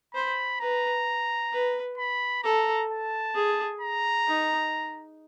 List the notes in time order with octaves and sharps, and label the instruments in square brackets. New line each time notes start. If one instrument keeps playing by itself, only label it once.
[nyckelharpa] C5 [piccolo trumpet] B5
[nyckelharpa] B4 [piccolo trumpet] A#5
[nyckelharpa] B4
[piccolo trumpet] B5
[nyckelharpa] A4 [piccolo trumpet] A#5
[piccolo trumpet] A5
[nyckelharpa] G#4
[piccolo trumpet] A#5
[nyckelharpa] D#4